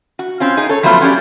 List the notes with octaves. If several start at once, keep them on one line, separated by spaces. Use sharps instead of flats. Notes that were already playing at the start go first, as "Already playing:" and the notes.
F#4
C4 C#4 F4
D#4 G#4
A4 C#5
F3 F#3 A3 B3 F4
F#3 C#4 G4 D5